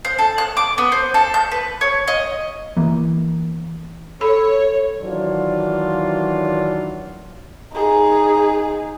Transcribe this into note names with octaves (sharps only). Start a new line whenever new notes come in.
C5
A4
F#6
D6
B3
C5
A4
G6
B4
C#5
D#5
E3 A#3
A4 C#5 B5
D#3 E3 F#3 D4 F4
D#4 G#4